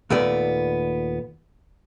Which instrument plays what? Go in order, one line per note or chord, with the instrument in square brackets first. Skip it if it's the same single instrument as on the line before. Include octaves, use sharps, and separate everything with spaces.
[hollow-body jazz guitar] D#2 A#2 A3 B3 D5